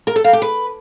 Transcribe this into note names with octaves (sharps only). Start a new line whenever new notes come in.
A#4
A4
F5
G4
B4